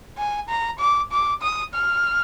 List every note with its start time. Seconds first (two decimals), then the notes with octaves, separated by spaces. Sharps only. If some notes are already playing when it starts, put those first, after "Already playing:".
0.18 G#5
0.49 A#5
0.79 D6
1.12 D6
1.42 D#6
1.74 F6